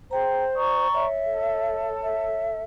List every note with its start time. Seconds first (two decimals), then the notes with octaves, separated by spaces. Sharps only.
0.11 G#4 C5 G5 A#5
0.55 D5 A#5 C#6 D#6
0.94 C#5 E5
1.25 A4
2.03 E5